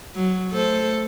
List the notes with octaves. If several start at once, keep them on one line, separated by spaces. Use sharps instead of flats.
F#3
A3 A4 C5